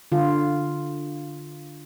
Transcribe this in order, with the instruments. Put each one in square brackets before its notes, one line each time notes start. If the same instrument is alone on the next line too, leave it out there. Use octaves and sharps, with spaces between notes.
[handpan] D3 F4